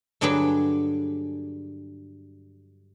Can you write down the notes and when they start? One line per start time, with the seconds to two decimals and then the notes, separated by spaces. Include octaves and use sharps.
0.21 G2 D3 F#3 D4 G#4 B4